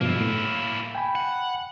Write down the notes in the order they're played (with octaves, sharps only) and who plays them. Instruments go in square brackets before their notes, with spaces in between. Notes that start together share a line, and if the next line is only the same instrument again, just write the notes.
[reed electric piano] G2 B2 F3 [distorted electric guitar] A#3 E4
[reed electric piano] A2
G5 G#5 B5
[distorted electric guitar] F#5